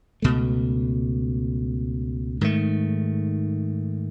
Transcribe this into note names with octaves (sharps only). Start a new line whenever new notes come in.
C#2 B2 A3
G#2 D#3 A3